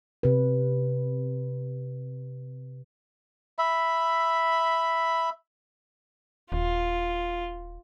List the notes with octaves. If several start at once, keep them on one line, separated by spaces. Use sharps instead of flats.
C3 B4
E5 B5
D#1 F4